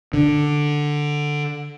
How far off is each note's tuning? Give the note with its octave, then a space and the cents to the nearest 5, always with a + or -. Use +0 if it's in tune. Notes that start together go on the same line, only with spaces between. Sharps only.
D3 +5